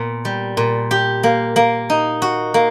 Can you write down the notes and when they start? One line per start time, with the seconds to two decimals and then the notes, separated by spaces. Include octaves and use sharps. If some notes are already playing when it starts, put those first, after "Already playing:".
Already playing: A#2 B3
0.25 G3
0.57 A#2
0.91 G4
1.23 A#3
1.56 A#3
1.90 D#4
2.22 F#4
2.54 A#3